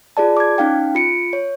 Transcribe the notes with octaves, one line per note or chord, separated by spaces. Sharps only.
F4 G#4 D5 A5
D6 G#6
C#4 D#4 F5 G5
F4 C#7 D7
C#5